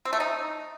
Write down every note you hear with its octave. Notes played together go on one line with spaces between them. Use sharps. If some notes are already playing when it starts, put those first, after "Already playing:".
C4
A3
D#4